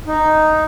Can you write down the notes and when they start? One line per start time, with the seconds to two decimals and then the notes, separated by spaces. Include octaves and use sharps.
0.07 D#4